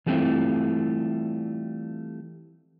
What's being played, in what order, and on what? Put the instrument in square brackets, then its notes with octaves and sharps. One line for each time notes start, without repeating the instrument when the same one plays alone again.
[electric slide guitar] E3 G3 A3 C4 E4 F4